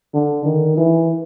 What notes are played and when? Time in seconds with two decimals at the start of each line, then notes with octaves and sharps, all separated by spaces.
0.14 D3
0.45 D#3
0.77 E3